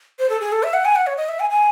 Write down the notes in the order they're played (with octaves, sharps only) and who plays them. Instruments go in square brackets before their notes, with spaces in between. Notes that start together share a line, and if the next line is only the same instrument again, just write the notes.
[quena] C5
A4
G#4
A4
E5
F#5
G#5
F#5
C#5
D#5
E5
G#5
G#5